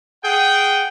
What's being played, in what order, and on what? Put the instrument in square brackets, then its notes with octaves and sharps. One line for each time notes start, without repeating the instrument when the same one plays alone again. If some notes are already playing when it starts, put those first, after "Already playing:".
[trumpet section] G#4 F#5 G5